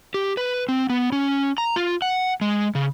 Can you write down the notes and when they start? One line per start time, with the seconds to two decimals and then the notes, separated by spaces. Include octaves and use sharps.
0.14 G4
0.37 B4
0.69 C4
0.90 B3
1.12 C#4
1.58 A#5
1.76 F4
2.02 F#5
2.41 G#3
2.75 C#3